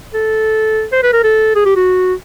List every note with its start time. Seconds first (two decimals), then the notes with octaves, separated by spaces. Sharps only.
0.14 A4
0.92 C5
1.03 B4
1.13 A#4
1.23 A4
1.55 G#4
1.65 G4
1.76 F#4